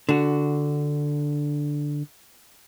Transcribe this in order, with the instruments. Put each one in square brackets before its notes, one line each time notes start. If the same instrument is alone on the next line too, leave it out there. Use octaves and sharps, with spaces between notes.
[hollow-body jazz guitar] D3 F#4